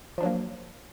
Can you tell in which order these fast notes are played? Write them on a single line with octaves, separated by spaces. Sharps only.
F3 D4 F#3 A#3